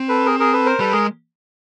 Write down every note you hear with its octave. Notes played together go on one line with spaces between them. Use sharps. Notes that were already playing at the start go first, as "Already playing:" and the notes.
Already playing: C4
A4 B4
G#4 A#4
G#4 A#4
A4 B4
A#4 C5
G3 A4 B4
G#3 G#4 A#4